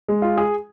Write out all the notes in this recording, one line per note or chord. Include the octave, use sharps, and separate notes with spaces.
G#3
F4
G#4